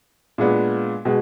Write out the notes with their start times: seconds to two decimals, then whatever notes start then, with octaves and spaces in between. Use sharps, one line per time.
0.38 A#2 G#3 B3 D4
1.05 B2 G#3